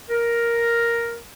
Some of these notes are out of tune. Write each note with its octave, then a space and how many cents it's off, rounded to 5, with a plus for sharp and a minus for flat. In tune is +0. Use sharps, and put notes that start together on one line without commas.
A#4 +5